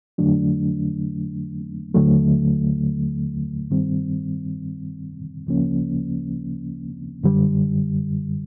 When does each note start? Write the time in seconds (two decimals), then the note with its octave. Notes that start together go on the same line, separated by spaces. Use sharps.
0.18 F2 D3 F#3 A3 D4
1.94 D#2 D3 F#3 A3
3.71 G2 D#3 G3 C4
5.47 D2 C#3 F3 A#3 C#4
7.23 F#2 D3 G3